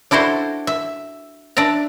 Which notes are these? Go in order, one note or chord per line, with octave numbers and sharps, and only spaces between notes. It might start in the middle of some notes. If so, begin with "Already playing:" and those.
D4 E4 F#4 A4 C5
E5
D4 D5 E5 A#5